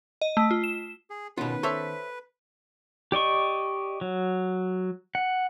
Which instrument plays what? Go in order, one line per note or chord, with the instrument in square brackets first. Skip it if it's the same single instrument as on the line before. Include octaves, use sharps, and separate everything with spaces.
[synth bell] D#5
A3
F4
E7
[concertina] G#4
[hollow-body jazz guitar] B2 F4 [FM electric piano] D#3 B3 C#4 [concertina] B4
[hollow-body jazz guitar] A4 A5 [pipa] C5 C#5 E5
[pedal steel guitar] G4 D5 D#5 C#6
F#3
F#5